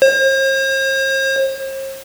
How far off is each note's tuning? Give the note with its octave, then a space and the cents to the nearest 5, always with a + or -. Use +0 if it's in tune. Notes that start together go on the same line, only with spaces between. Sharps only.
C5 +45